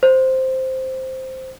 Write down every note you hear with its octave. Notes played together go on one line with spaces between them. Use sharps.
C5